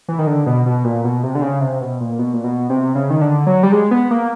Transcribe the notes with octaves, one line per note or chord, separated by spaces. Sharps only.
E3
D#3
D3
B2
B2
A#2
B2
C3
D3
C#3
C3
B2
A#2
B2
A#2
B2
C3
C#3
D#3
D3
F#3
G3
G#3
B3
A#3